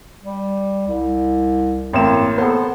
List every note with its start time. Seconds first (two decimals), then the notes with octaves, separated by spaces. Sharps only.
0.24 G3
0.88 C2
1.93 A1 A#3 C4 E7
2.38 B3 A4 C5